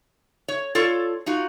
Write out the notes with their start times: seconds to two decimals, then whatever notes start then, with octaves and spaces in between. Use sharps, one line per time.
0.48 C#5
0.75 F4 A4 C#5 D5
1.26 D#4 F4 F#4